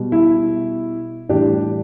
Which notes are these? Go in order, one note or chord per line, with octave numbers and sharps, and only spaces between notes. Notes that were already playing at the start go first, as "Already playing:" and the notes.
Already playing: B2 G3
E4
A2 E3 G3 D4 G4